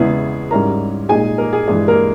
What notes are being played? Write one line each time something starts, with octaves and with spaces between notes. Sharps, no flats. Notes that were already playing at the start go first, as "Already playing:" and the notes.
Already playing: E2 C#3 G#3 B3 E4 G#4
G#2 G3 C#4 E4 A#4 A#5
A#2 G#3 D#4 G#4 G#5
A#3 A#4
G#4
G2 E3 G#3 G#4
A#3 A#4